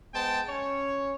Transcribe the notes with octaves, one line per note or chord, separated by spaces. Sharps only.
G#3 B3 C5 G5 A5
C#4 C#5